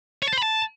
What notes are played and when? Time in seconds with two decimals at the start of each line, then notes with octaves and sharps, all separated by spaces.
0.22 C#5
0.27 A5
0.33 C5
0.38 B5
0.43 A5